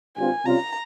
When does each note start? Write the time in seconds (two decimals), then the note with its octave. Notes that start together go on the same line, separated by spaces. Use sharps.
0.17 G#1 G2 G3 C4 F4 G#5
0.45 C3 G3 C#4 F4 A#5